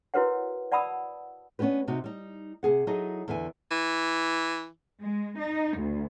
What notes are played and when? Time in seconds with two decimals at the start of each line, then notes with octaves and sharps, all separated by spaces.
0.14 E4 F#4 A#4 B4 C#5 F#5
0.72 D5 F#5 A5 B5 D#6 E6
1.59 B3 C#4 D4 G4 B4
1.88 C3 D#4 F#4
2.04 G3 D#4
2.63 C3 F3 G#4 F#5
2.87 F#3 D#4 E4 G#4 A4 D#5
3.28 E2 D3 E5 G#5
3.71 E3
5.01 G#3
5.39 D#4
5.76 D2